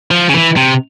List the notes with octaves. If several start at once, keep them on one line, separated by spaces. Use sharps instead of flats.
F3
C#3
E3
C3